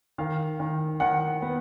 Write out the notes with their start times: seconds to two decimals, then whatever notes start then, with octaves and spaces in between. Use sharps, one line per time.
0.18 D#3 F5
0.60 D#3
1.00 D#3 F#5
1.42 B3